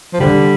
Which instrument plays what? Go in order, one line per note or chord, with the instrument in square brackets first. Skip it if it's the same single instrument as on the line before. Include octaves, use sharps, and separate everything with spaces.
[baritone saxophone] F3
[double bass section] D3 [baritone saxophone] G3